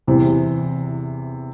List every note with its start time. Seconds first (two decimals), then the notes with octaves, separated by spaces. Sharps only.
0.07 E2 C3 E3